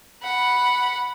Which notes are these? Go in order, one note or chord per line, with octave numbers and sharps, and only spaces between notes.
F#5 B5